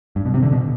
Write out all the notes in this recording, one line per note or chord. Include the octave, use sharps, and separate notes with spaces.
G2
B2
C3
D3
B2